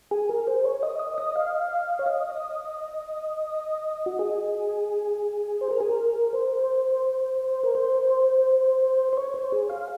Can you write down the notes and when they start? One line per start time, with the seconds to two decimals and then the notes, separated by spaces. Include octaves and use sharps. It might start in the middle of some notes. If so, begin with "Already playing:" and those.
0.11 G#4
0.29 A#4
0.47 C5
0.64 C#5
0.83 D#5
0.99 D#5
1.18 D#5
1.36 F5
1.99 C#5
2.06 D#5
4.06 F#4
4.19 G#4
5.61 C5
5.71 A#4
5.80 G#4
5.89 A#4
6.33 C5
7.63 A#4
7.75 C5
9.13 C5
9.17 C#5
9.34 C5
9.52 G#4
9.69 F5